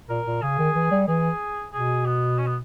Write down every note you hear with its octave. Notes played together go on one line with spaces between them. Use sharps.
A#2 A#4
A#2
C#3 G#4
D#3
E3
G3
E3 G#4
B2 G#4
B3
C#4
B3